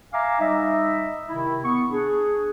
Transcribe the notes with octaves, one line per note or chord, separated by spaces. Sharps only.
E5 F5 G#5 A#5 D6
G3 D#4 D#5 E5
C3 D#3 E4
B3 C#6
D4 G#4